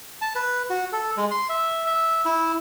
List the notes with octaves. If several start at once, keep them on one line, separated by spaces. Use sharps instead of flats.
A5
B4
F#4
A4
G#3
C6
E5
E5
E4